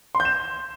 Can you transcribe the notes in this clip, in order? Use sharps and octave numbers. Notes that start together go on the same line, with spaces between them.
C6
G6
E7